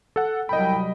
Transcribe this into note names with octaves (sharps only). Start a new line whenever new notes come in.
A4 F#5
C2 C3 F#3 G3 D#5 G5 B5